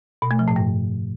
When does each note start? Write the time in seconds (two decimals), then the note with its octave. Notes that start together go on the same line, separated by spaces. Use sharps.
0.22 B2
0.31 A3
0.39 F3
0.48 A2
0.56 G2